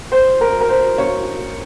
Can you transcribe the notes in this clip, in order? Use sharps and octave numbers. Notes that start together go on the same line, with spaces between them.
C5
A#4
A#4
C5
C#5